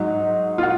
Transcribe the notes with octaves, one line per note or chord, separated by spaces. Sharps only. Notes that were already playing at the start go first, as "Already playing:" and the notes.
Already playing: G#2 F#3 D#4
F4
F#4